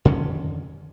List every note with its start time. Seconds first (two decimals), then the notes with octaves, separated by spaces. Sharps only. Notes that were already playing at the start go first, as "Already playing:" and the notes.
0.05 F2 D3 D#3 C#4